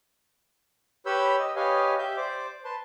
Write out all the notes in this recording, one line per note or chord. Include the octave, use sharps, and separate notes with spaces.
G4 B4 C#5 B5 E6 G6
D#5
G4 B4 C#5 D#5 F5 G#5
G4 E5 G6
C5 D5 D6
B4 A5 C6